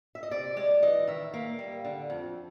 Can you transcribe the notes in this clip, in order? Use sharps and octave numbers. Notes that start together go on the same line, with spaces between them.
E5
D#5
C3 D5
G#3 D5
E3 D#5
D#3 E5
A#3
G3
D3
F2